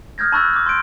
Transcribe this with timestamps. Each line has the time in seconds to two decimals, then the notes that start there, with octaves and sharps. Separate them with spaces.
0.18 D#6 F6 G6 G#6 A#6
0.32 A5 B5 C#6 E6 F#6 A6
0.53 D6 F6
0.66 C6 G6 D7